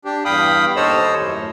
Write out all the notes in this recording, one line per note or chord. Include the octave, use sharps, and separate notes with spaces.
D4 G4
E2 G2 F5 G5 B5 D#6
D#2 A4 C5 C#5 D#5 E6
F#2 A2